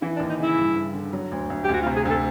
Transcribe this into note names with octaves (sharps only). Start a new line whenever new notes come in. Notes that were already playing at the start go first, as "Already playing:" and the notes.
E3 E4
D4
D#2
D#4
C#3 E4
G2
G2
D3
F#3
D2
D2
G4
D2 F#4
F4
C3
G#4
D2 A4